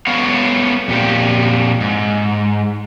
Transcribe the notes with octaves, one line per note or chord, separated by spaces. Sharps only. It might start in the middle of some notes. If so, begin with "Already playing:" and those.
A3 B3 C#5 F5
F2 A#2 G4
G#2